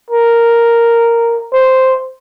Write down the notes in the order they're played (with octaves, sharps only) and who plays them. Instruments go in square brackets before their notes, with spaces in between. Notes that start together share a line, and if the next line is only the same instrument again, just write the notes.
[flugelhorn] A#4
C5